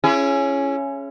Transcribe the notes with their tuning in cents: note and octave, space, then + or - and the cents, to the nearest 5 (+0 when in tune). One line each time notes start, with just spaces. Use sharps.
C#4 +0 E4 +35 G#4 +10